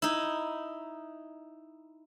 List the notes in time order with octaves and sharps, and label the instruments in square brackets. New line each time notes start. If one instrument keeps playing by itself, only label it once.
[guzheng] D#4 E4